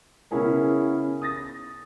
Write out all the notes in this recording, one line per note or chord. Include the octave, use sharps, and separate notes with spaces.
C#3 B3 C#4 E4 G#4 A#4
D#6 A6 A#6